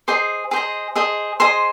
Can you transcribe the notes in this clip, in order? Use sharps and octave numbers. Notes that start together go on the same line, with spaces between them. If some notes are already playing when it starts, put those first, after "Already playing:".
G#4 C5 D#5 D6
G#4 C5 D#5
G#4 C5 D#5
G#4 C5 D#5 C6